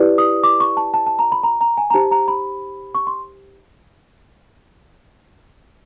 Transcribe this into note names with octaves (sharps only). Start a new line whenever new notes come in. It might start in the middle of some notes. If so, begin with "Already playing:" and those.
Already playing: E4 G4 B4 D5
D#6
D6
C#6
A5
A5
A5
A#5
B5
A#5
A#5
G#5
A#5
D#4 G4 C5 A5
A#5
B5
C#6
C6